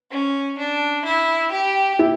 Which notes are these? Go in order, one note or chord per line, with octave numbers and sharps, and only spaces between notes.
C#4
D4
E4
G4
E4 G4